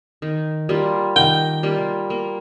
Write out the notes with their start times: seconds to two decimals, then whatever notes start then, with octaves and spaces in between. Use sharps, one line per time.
0.22 D#3
0.69 G3 A#3 F4
1.16 D#3 G5
1.63 G3 A#3 F4
2.10 A#3